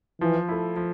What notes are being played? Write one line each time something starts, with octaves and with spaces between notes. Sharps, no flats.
E3 F3
A3 E4
F3